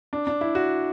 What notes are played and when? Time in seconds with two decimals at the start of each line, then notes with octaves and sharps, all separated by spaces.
0.13 D4
0.27 D4
0.41 E4
0.55 F#4